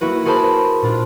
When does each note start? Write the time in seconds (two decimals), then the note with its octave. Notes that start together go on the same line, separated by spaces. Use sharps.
0.01 A#3 E4 F#4 B4
0.25 F#4 G#4 A#4 C5 A5 B5
0.82 A#2 D4 F4